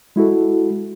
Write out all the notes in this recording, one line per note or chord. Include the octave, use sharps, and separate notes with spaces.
G#3 E4 F#4 A4